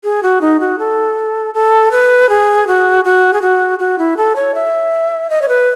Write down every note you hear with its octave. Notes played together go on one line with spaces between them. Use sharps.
G#4
F#4
D#4
F#4
A4
A4
B4
G#4
F#4
F#4
G#4
F#4
F#4
E4
A4
C#5
E5
D#5
C#5
B4